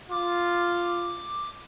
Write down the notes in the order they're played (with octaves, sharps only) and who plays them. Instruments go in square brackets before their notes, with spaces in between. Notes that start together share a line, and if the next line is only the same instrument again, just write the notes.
[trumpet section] F4 [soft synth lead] D6